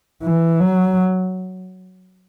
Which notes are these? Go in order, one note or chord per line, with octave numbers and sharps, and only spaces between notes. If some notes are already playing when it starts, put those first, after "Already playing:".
E3
F#3